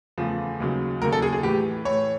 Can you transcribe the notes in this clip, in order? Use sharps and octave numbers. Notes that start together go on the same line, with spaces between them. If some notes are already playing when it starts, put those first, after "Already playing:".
E2 C#3 F3 A3
D#2 C#3 F#3
D#2 C#3 F#3 A#4
A4
G#4
G#4
A2 E3 A3 G4
A2 E3 A3 C#5